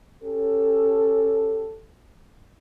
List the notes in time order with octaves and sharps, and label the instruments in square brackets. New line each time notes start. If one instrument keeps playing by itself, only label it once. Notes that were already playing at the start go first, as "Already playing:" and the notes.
[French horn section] C#4 G4 A4